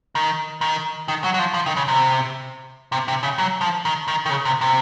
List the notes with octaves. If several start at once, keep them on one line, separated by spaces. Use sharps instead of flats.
D#3
D#3
D#3
F#3
F#3
F3
F3
D#3
C#3
C3
C3
C3
C#3
F#3
F3
D#3
D#3
D#3
C#3
C3
C3